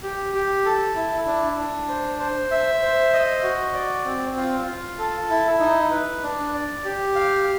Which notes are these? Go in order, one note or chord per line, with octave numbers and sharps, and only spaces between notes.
G4
G4
A4
E4
D4
D4
C5
C5
E5
C5
D#5
F#4
D5
C4
F4
F4
A4
E4
D#4
B4
D4
D5
G4
F5